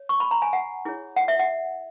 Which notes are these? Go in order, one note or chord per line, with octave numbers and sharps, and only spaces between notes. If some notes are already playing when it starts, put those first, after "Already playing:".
Already playing: C#5
C#6
B5
A#5
G#5
F#5
E4 G#4 C#5
F#5
E5
F#5